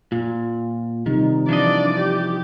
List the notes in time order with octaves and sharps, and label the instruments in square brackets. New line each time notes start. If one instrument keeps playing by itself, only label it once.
[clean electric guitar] A#2 [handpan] F4
[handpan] C3 G3 D#4 [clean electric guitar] D#3
[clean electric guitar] E3 F3 D#5 [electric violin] D4 D5
[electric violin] G4